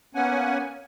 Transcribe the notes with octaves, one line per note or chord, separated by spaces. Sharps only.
A#3 B3 C#4 F#5 G#5